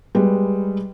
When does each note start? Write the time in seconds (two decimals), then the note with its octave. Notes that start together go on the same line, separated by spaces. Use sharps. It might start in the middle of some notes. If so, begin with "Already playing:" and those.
0.15 G3 G#3 B4